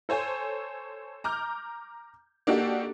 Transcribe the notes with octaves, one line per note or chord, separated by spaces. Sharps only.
A4 C5 C#5 G#5
A#5 D6 F6 G6
A#3 D4 D#4 F#4 G4 A4